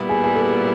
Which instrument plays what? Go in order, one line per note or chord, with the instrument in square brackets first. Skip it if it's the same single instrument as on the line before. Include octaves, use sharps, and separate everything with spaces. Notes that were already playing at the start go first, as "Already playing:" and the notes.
Already playing: [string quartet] A#2 G3 B3 E4
[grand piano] G#4
G#4
A4